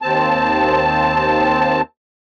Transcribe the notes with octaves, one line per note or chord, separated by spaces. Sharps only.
D#2 C4 A5